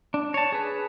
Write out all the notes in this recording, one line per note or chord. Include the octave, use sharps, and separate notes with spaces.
D4
C#5 A5
G#4 B4